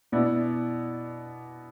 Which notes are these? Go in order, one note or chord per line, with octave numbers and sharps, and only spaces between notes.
B2 B3 E4 D5